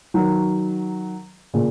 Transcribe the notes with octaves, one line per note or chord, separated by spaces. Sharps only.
D#3 F#3
A#2 C#3